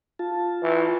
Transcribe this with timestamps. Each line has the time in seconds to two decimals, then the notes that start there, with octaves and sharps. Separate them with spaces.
0.19 F4 A5
0.63 E3